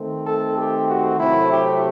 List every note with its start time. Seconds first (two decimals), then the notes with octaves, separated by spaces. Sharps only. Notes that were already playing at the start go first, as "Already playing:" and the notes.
Already playing: D#3 A3 C4
0.25 A4
0.56 G4
0.87 F#4
1.18 C3 F#3 A3 C4 E4
1.50 G4